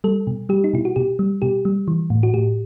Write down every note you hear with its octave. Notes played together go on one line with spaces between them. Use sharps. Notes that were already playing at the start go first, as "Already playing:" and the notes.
G3 A4
B2
G3 G4
D#4
B2 E4
F#4
B2 G4
G3
B2 G4
G3
E3
A2
F#4
A2 G4